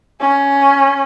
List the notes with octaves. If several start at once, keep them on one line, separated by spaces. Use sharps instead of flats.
C#4